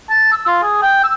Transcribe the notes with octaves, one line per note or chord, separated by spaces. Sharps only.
A5
E6
F4
G#4
G5
E6